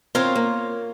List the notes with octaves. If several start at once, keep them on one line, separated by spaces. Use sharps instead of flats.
C4 F4 A#4 C5 C#5
A#3